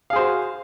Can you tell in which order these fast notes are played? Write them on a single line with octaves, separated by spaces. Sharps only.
F5 G#4 C5 F#4